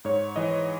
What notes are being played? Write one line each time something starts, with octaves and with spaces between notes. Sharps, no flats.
G#2 C#5
E3 D#5